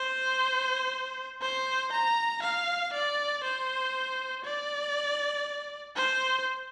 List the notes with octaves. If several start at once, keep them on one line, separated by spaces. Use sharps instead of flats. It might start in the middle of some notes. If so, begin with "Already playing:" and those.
Already playing: C5
C5
A#5
F5
D5
C5
D5
C5